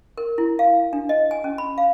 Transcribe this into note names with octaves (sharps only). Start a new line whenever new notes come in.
A#4
E4
F5
D4
D#5
G#5
C#4
B5
F5